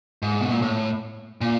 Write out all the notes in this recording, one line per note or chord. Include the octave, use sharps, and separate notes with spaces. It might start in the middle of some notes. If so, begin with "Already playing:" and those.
G#2
B2
A#2
A2
A#2